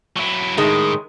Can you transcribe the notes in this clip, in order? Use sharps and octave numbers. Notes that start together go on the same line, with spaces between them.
F#3 E4
A2 D#3 G#3